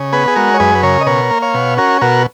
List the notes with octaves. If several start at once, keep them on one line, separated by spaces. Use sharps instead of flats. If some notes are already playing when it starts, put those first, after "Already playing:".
Already playing: C#3
B3 G#4 B4
G#4
G#3 F#4 A#4
C#5
F#2 G#4 B4
B4
C#3 A#4 C#5
D#5
B2 A#4 C#5
A#3
C#5 F5
B2
C#4 F#4 A#4
B2 F#4 A#4